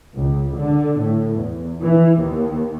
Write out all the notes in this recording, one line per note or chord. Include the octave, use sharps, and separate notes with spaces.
C#2
D3
A2
E2
E3
D#2